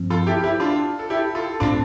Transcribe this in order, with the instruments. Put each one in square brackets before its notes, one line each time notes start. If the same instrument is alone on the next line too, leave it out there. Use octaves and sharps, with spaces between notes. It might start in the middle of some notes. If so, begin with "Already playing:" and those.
Already playing: [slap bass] G2 F3 C4
[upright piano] F4 A4
E4 G4
E4 G4
D4 F4
A4
E4 G4
F4 A4
[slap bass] A2 F3 C4 [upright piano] D4 F4